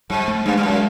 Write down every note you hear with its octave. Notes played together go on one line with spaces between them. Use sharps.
G#2 G3
A3
G2 G#3
G2
F#2
G#3